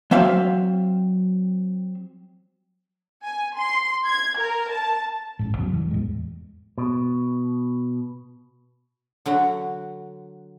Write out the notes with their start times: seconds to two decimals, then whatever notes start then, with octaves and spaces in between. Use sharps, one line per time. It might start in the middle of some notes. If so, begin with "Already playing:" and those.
0.11 F#3 C4 E5 F5
3.24 G#5
3.58 C6
4.06 G#6
4.38 A#4
4.71 A5
5.39 A1 G#2
5.58 E2 C#3 F#3
5.74 G2 E3
5.91 E2 A2 G#3
6.78 B2
9.26 D3 F#3 F#5